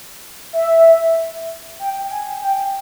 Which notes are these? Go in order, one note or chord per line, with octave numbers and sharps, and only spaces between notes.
E5
G5
G#5
G5